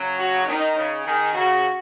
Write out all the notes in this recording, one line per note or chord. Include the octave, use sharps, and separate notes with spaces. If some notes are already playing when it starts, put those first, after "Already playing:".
Already playing: C#3 F#3
F#4
D#3 D#4
C#3
D#3 G#4
C#3 F#4